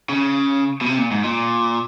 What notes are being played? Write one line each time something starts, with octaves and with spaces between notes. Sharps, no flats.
C#3
B2
C3
A#2
G#2
A#2